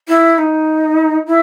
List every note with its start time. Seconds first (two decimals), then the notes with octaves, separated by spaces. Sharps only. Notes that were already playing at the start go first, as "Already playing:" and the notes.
0.08 E4
0.38 D#4
1.27 E4